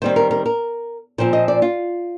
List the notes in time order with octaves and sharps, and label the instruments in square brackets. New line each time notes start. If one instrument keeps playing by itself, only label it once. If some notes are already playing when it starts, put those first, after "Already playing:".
[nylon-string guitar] D#3 G3 C4 C5
A#4
A#4
A#4
A#2 F3 C4 C5
D#5
D5
F4